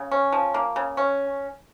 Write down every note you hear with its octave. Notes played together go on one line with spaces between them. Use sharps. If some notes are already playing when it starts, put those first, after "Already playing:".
Already playing: C#3
C#4
F3
A#3
C#3
C#4